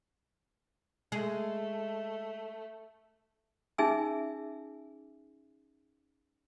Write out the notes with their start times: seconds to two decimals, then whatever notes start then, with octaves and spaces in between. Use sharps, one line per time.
1.12 G#3 A3
3.78 C#4 D#4 G#4 E5 G#5 E6